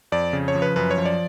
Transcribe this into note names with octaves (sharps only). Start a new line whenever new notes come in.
F2 D5
C#3
C#5
F3
B4
F#2 B4
C#5
F3
D5